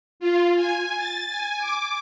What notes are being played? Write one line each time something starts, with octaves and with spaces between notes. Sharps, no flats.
F4
G#5
A6
G#5
D6